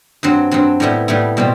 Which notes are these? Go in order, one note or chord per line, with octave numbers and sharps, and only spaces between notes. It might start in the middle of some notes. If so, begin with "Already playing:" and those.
G2 F#3 C4
G2 F#3 C4
A2 G3 B3 E4
A2 G3 B3 E4
B2 G3 C4